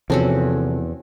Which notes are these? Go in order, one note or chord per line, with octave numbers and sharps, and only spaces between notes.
E2 C3 F3 C4 C#4 F#4 A4